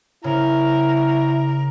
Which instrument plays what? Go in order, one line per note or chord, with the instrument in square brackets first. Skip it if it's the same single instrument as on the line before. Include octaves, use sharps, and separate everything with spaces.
[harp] C#3 [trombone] E4 [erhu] A#4